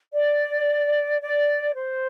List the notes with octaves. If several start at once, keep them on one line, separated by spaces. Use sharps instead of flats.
D5
D5
C5